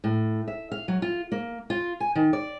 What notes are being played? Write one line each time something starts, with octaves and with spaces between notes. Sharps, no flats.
A2
E5
F5
F#3
F4
A#3
F4
G#5
D#3
D5